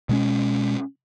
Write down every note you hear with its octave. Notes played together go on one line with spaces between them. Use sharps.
B2 G#3 C#4